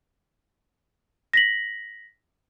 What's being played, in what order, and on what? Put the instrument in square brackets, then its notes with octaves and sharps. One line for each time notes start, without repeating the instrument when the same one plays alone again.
[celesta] A#6 B6 F#7